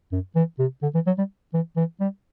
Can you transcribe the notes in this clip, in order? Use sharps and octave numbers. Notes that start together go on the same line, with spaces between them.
F#2
E3
C3
D3
E3
F#3
G3
E3
E3
G3